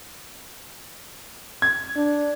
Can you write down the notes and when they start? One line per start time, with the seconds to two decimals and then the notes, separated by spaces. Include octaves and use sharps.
1.62 G#6
1.96 D4